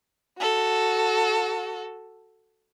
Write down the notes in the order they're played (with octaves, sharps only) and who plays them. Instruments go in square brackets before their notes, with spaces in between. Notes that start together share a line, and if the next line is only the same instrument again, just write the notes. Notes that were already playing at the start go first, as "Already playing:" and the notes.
[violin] F#4 A4